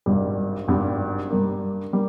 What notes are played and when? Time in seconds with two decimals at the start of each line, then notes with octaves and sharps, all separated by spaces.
0.06 G#1 G2 G3
0.68 G#1 G2 G3
1.30 G2 G3 A#3
1.93 G3 A#3